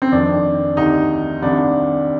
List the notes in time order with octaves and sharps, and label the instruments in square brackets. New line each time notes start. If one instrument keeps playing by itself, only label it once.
[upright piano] C4
F1 F2 D#3 D4
D2 C3 D#3 D#4
C2 C3 D#3 D4